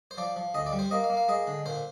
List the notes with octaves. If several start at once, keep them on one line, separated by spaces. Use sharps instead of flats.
C5
F3 D5
F3
D2 D#5
D5
G3
C5
A#3 D#5
F5
A#3
F5
G#3 D#5
D3
A#2 C5